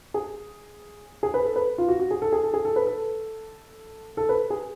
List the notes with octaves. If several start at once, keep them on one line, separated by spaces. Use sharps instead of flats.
G#4
G#4
B4
A4
B4
F4
F#4
F#4
G#4
A4
G#4
A4
G#4
A4
B4
A4
A4
B4
G#4